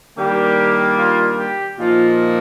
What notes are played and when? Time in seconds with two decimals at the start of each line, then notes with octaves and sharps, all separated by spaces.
0.17 D#3 G3 A#3 D4 G4
0.99 F4
1.38 G4
1.79 A#2 F3 A#3 D#4 F4